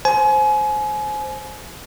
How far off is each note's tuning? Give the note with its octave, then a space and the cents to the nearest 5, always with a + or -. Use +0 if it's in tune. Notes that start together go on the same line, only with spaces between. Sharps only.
C5 +0 G#5 +30